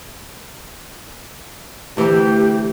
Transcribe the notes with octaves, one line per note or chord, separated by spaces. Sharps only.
D2 E3 G4